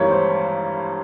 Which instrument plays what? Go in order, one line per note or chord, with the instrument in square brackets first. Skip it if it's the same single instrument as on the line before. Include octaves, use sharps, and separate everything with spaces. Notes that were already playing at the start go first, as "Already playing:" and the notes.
Already playing: [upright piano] G#1 G2 E3 G3 A#3 [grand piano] C#5
[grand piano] C5